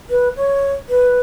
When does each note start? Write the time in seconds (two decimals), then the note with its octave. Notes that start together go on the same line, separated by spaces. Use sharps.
0.10 B4
0.36 C#5
0.89 B4